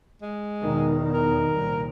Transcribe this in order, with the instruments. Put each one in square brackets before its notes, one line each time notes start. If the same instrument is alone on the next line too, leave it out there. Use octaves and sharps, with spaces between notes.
[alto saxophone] G#3
[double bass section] E2 B2 D#3
[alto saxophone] A#4
[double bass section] C2 A#2